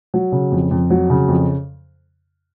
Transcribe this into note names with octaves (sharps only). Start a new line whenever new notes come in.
F#3
C#3
F2
F2
F#3
C#3
F2